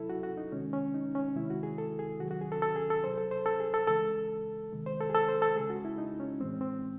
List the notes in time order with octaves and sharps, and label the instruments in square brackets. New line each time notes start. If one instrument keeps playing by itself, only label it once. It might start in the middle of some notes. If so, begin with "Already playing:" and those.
Already playing: [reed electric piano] C3 F#3 E4 A4
F#4
F#4
D#4
C3 D#3 G#3 C#4
C#4
D#4
C#4
C3 D#3 G#3 E4
F#4
G#4
A4
G#4
C3 D#3 F#3 F#4
F#4
G#4
A4
A4
G#4
A4
C3 F#3 C5
A4
C5
A4
G#4
A4
C#3 E3 G#3 A4
C3 D#3 G#3
C5
A4
G#4
A4
C5
A4
C#3 G#3 G#4
F#4
E4
D#4
C#4
A2 E3 G#3 C4
C4